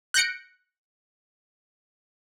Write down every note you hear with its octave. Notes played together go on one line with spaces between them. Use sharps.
F#6 G6 A#6 C#7 D7